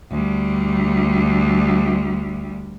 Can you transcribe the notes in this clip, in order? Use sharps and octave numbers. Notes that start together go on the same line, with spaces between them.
D2 G3